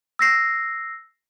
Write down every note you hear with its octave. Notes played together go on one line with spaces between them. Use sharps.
E6 A#6 C7